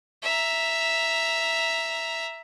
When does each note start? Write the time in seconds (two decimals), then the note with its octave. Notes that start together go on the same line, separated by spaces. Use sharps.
0.23 E5 A#5